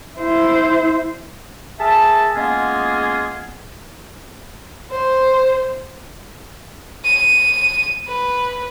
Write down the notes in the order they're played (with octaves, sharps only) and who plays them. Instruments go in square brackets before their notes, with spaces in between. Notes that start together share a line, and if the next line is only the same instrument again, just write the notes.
[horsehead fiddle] E4 C5
[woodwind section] G#4 A#4 E5 A5
G#3 A#3 B3 C#4 F4 G#4
[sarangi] C5
[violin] D#7
B4